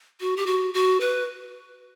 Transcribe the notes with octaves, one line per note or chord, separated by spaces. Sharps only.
F#4
G4
F#4
F#4
B4